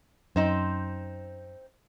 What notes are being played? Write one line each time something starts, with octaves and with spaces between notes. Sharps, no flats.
F#2 C4 D#4 C5